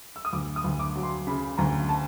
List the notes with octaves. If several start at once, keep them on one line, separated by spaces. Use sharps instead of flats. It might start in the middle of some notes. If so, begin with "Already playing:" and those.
E6
D#6
D2 D6
D#6
D2
D6
F#3
C6
C#3 B5
D2 A#5
A5